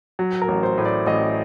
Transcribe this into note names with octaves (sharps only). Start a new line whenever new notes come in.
F#3
A#4
A1
C5
A2
D5
A1 D#5